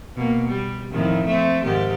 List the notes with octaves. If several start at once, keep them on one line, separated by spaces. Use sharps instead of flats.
B2 A#3
G3
F2 A2 D#3
A3 C4
G#2 D#3 G4